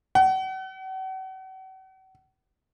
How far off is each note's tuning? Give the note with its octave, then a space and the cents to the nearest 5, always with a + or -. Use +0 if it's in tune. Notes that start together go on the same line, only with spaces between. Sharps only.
F#5 +40